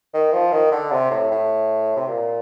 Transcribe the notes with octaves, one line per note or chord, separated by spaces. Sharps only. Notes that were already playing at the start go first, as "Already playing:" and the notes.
D#3
F3
D#3
D3
C3
A2
A2
C3
A#2